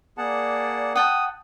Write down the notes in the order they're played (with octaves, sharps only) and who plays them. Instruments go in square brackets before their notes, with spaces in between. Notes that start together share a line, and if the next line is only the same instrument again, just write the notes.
[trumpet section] A#3 D5 [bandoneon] G#4 F#5 A5
[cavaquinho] F#5 G5 A5 [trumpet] D#6